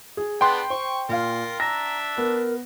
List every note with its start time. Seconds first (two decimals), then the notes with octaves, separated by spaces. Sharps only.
0.17 G#4
0.41 B3 D4 G5 C6
0.70 C5 C#6
1.09 A#2 F4 A#4 F5
1.60 D4 E5 A#5 A#6
2.18 B3 A#4